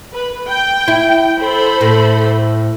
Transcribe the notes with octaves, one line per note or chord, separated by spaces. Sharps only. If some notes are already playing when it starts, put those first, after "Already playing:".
B4
G5
E4
A4 C5 B5
A2